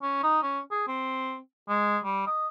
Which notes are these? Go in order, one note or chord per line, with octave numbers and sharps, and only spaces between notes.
C#4
D#4
C#4
G#4
C4
G#3
G3
D#5